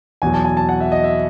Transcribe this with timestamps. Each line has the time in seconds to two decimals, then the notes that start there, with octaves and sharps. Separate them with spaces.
0.22 E2 B2 F#3 G#5
0.34 A5
0.45 G#5
0.57 A5
0.69 F#5
0.81 E5
0.92 D#5
1.04 E5